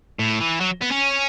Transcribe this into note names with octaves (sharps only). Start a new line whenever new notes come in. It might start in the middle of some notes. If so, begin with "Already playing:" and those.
A2
E3
F#3
B3
C#4